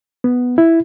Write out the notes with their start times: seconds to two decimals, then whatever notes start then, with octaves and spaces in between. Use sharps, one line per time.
0.24 B3
0.58 E4